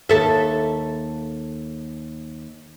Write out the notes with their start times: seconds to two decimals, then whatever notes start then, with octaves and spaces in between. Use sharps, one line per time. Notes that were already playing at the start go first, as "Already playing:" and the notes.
0.09 D#2 A4 E5